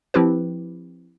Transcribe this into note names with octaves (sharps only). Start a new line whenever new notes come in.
F3 C4 E4 G4 B4